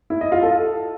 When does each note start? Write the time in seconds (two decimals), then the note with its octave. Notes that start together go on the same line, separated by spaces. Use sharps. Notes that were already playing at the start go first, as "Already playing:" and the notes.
0.10 E4
0.21 D#5
0.32 F4
0.43 A4